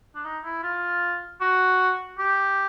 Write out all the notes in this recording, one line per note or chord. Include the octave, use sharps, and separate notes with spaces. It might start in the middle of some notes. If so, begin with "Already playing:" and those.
D4
D#4
E4
F4
F#4
G4